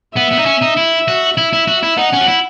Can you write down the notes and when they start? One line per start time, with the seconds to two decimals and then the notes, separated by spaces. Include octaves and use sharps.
0.17 B3 E5
0.33 B3
0.39 D#4
0.46 C#4
0.62 D#4
0.77 E4
1.08 F#4
1.38 E4 E5
1.53 E4
1.68 F#4
1.83 E4
1.98 D#4 F#5
2.13 C#4
2.21 F#4
2.28 E4